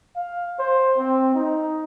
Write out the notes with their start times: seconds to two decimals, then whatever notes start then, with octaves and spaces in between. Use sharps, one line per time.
0.15 F5
0.59 C5
0.98 C4
1.35 D#4